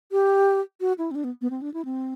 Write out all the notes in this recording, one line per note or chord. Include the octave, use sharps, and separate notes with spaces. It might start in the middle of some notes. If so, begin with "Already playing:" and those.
G4
F#4
E4
C4
D4
B3
B3
C4
D4
E4
C4